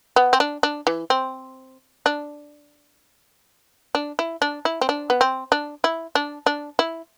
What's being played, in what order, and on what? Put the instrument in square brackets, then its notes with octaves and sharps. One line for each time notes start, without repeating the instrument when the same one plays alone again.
[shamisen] B3
C4
D4
D4
E3
C4
D4
D4
E4
D4
E4
C4
D4
B3
C4
D4
E4
D4
D4
E4